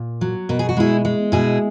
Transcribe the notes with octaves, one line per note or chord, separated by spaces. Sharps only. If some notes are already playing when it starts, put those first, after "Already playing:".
Already playing: A#2
F#3
B2 A#4
G#4
F#4
G#3 E4 G#4
G#3
B2 E4 G#4